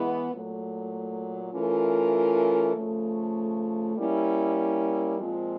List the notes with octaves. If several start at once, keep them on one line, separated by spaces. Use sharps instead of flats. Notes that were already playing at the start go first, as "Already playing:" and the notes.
Already playing: E3 G#3 B3 E4
A#2 F#3 A3
E3 A3 C#4 F4 A#4
C#3 F3 A3
G3 A#3 C#4 E4
A#2 F3 G#3 C4 F4